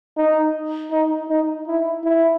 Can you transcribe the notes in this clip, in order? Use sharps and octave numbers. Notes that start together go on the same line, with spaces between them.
D#4
D#4
D#4
E4
E4